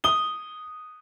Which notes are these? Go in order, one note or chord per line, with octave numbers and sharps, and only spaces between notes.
D#6 G7